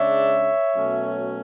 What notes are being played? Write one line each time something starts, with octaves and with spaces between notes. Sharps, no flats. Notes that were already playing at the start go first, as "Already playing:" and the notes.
Already playing: C#3 G#3 D4 C#5 E5
B2 F#3 A3 C#4